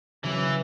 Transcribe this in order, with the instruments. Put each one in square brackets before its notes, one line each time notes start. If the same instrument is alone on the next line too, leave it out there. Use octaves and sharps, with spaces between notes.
[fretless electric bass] C#3 F#3 C#4 [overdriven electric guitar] E3